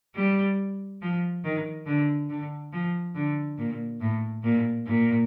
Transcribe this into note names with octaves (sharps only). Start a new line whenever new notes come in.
G3
F3
D#3
D3
D3
F3
D3
A#2
A2
A#2
A#2